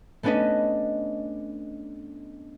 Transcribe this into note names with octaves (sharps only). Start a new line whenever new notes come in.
A3 B3 C#4 D4 B4 D#5